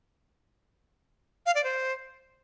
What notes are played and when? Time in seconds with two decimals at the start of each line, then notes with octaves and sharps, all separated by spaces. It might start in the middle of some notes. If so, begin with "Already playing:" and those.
1.46 F5
1.55 D5
1.64 C5